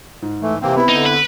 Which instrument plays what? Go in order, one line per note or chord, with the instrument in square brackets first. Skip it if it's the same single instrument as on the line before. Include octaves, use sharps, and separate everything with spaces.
[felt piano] G#2
[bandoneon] E3 [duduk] A3
[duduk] C3 [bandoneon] E3 A#3 C4
[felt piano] B3 C4 B5 [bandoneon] E4
[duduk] D3 [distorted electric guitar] D#4
[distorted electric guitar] B4